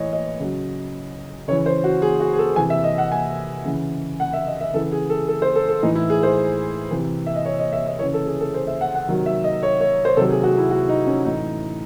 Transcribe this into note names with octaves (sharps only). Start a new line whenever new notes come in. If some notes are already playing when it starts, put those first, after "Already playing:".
Already playing: A2 E3 C#5 D#5
D#5
C#3 F#3
C#3 E3 C#5
C5
F#4
G#4
F#4
G#4
A4
C3 E3 G#5
E5
D#5
F#5
G#5
C#3 E3
F#5
E5
D#5
E5
C#3 E3 A4
G#4
A4
A4
C5
A4
A4
A2 E3 D#4
E4
G#4
C5
C3 E3
E5
D#5
C#5
D#5
E5
D#5
C#3 E3 C#5
A4
G#4
A4
C5
E5
F#5
F#5
C3 D#3 F#3
E5
D#5
C#5
C#5
C5
C3 D#3 F#3 A4
G#4
F#4
E4
F#4
D#4
C#4
A2 E3 D#4